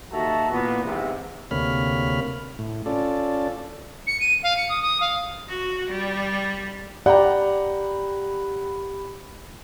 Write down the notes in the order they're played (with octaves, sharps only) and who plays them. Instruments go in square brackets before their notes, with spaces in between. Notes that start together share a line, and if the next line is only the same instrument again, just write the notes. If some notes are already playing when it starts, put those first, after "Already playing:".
[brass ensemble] D#2 F#4 A4 E5 A5 A#5
A#2 E3 B3
E2 G#2 C3
[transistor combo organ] D2 C3 A#3 C#5 B5 F6
A2
C#4 F4 A4 D5
[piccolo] C#7
D#7
F5
C#7
D#6
D#6
F5
[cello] F#4
G3
[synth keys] G4 B5 [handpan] D5 [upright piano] F#5 G5 A#5